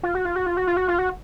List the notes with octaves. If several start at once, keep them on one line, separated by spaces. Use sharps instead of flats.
F4
F#4
F4
F#4
F4
F#4
F4
F#4
F4
F#4